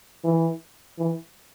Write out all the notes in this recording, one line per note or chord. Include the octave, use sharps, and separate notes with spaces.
E3
E3